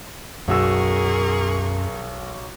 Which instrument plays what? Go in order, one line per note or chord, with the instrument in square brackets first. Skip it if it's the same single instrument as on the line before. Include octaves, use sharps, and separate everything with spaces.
[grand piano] B1 F#4 E6 [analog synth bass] F#2 [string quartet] G#4 A#4 C#6